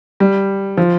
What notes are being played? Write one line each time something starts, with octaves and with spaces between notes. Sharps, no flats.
G3
F3